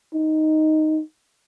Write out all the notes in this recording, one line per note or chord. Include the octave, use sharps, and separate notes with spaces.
D#4